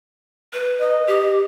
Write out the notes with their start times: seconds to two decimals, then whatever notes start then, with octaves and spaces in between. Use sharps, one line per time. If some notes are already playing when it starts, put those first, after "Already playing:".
0.53 B4
0.80 D#5
1.07 G4